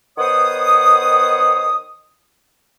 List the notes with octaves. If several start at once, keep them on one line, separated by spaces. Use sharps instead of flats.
D#3 B3 C5 C#5 F#5 D#6